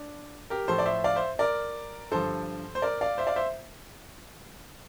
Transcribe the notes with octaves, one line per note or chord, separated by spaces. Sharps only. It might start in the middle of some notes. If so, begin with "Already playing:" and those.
Already playing: D4
G4 A#4
A2 F3 A4 C5
D5
C5 E5
D5 F5
C5 E5
A#4 D5
G2 D3 F3 A4 C5
C5
A#4 D5
D5 F5
C5 E5
D5 F5
C5 E5